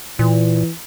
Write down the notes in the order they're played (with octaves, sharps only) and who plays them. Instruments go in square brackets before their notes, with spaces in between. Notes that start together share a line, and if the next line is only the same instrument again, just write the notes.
[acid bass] A#2 [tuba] E3